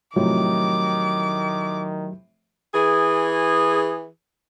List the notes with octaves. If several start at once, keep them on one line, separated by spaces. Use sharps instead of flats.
A2 C3 D#3 F3 F#3 D6
E3 G#4